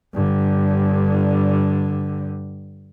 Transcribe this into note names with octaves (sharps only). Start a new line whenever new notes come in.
G2 D3